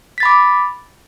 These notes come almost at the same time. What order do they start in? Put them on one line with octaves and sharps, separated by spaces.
B6 A6 B5 D6